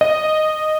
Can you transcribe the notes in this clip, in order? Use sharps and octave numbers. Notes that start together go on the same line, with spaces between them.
D#5